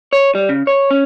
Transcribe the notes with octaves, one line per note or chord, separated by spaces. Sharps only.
C#5
G3
C#3
C#5
C#4